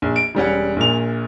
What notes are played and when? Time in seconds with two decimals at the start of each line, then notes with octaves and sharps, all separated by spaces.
0.02 A#1
0.16 D7
0.35 E1 G3 C#4 F#5
0.76 A#1 A#2 F7